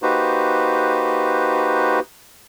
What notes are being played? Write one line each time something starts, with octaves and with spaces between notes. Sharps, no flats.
A#3 D#4 F#4 G4 B4 C5